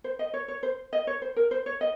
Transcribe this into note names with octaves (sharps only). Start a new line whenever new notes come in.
C5
D#5
C#5
C#5
C5
D#5
C#5
C5
A#4
C5
C#5
D#5